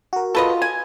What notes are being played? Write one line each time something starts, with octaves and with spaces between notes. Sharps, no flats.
F#4 A#4
F4 A4 B4 D#5
G#5